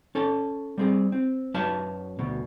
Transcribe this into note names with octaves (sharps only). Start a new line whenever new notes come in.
C#4 A4 A5
G3 C4 G#4
C4
F#2 F#3 B4 F5 A5
D2 B2